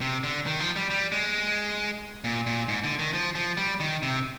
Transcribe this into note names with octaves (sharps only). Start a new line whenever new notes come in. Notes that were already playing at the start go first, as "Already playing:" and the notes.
C3
D3
D#3
F3
G3
G3
G#3
A#2
A#2
G#2
D3
D#3
F3
F3
G3
D#3
C3